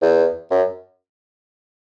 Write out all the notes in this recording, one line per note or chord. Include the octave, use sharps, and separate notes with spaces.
E2
F#2